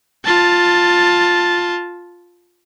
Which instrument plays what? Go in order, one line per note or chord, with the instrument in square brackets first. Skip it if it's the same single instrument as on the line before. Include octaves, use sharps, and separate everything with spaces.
[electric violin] F4 A5